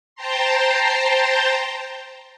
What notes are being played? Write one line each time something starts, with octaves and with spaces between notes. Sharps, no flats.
C5 G5 A5 A#5 C6